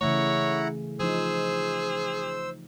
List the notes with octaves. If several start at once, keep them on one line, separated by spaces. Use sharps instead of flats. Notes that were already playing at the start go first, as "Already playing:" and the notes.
C#3 E3 A3 E4 C#5 F#5 A#5
F3 D#4 G#4 C5 E6